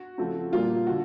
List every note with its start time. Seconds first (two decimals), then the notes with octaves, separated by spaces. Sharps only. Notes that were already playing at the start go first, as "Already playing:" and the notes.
Already playing: F#4
0.18 C#3 F3 A3 C4 F4
0.52 A#2 G3 A#3 F4
0.87 D3 F#4